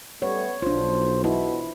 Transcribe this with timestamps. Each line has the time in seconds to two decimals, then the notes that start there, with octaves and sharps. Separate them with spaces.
0.22 G3 A3 B3 C#5
0.62 B1 D4 F4 C5
1.24 B2 E4